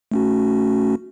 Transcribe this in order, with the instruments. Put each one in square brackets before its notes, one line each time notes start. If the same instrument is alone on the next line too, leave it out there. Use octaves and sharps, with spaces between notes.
[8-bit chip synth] A3 C#4 F#4